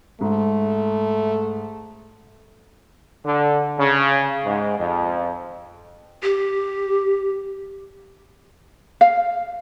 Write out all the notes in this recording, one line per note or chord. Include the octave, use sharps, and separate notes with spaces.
G#2 A3
D3
C#3
G#2
F2
G4
F5